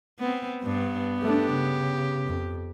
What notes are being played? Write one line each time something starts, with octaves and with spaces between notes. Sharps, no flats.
B3 C4
G2 B3 D4
A3 D4 G4
C#3
F2